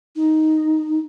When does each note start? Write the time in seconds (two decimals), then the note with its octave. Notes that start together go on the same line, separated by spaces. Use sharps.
0.16 D#4